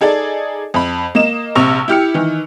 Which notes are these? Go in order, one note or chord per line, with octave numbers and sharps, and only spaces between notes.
D#4 G#4 A4 D5
F2 B5
A#3 D#5 E7
A#1 C3 C#6 E6 F7
E4 G4 F6 C#7
D#3 E3